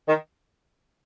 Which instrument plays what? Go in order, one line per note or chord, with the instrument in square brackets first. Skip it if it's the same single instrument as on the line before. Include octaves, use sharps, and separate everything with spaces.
[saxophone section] D#3